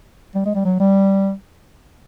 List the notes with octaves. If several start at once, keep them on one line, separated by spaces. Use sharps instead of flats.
G3
G#3
G3
F#3
G3